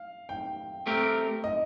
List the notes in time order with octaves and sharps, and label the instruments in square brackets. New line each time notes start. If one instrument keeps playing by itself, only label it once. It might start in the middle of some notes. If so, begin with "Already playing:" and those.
Already playing: [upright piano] F5
G5
[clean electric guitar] A3 C4 G4 A#4
[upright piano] D#5